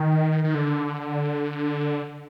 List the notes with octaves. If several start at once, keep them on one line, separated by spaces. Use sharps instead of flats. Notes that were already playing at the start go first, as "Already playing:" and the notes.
Already playing: D#3
D#3
D3